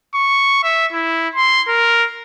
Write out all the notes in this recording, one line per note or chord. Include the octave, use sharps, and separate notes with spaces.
C#6
E5
E4
C6
A#4